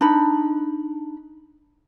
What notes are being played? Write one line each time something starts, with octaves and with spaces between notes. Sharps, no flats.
D4 D#4 B5